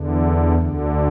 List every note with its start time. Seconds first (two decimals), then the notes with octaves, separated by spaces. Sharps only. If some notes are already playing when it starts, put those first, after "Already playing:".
Already playing: E2 D3
0.59 D2 D3